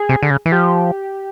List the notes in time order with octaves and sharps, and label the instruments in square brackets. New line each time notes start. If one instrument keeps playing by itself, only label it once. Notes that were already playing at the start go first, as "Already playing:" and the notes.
Already playing: [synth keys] G#4
[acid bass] C3
D3
C#3
E3
[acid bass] F3 [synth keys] G4